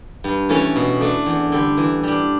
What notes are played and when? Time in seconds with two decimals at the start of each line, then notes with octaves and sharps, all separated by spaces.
0.24 G2
0.49 E3 A3 C#4
0.76 B2
1.01 A3 D4
1.26 E2
1.52 D3 G3
1.77 E3
2.03 G3 D4